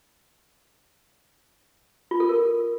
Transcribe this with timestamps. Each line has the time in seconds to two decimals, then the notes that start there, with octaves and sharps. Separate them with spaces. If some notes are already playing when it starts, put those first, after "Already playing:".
2.11 F4
2.20 A4
2.29 A#4